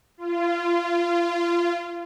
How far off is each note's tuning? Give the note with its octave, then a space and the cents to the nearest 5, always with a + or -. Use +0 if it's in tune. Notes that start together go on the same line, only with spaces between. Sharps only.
F4 -25